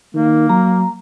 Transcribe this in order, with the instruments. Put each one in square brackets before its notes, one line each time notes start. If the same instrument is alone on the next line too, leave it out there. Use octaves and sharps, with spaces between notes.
[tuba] D#3 [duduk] A#3
[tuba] F#3 [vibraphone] A#5